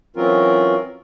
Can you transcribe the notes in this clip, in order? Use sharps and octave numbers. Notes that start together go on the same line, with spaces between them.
E3 F#3 C4 C#4 F4 A#4